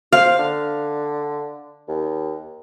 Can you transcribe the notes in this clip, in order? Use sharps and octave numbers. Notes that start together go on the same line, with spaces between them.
C5 F5
D3
D#2